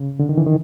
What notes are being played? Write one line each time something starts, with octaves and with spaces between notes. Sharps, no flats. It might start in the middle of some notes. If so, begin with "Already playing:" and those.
Already playing: C#3
D3
D#3
E3
D#3